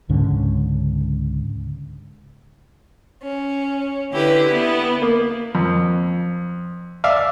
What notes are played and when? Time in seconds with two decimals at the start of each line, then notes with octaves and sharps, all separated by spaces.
0.09 C#2 G#2 D3 C#4
3.22 C#4
4.12 D3 E4 G4 B4
4.53 B3 E4
5.02 A#3
5.55 F2
7.04 D5 E5 F5